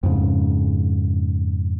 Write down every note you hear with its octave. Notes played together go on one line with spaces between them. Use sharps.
F2 G#2 C#3